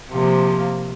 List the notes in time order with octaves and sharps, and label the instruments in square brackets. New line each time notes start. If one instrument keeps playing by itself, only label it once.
[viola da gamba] C3 F3 A#3